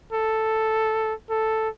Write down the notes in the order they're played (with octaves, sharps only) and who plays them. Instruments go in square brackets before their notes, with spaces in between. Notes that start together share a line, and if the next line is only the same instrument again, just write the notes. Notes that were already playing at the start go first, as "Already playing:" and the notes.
[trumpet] A4
A4